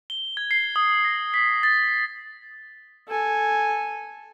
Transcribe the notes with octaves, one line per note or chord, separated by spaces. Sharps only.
G7
G#6
C7
D#6
A#6
B6
A6
A4 G#5